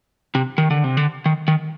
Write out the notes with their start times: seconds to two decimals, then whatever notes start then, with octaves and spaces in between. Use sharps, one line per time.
0.35 C3
0.58 D#3
0.71 D3
0.84 C3
0.97 D3
1.26 D#3
1.48 D#3